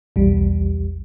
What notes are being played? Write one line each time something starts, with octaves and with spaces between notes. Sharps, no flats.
B1 E2 G3